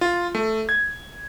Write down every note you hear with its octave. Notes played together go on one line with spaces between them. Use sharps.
F4
A3
G#6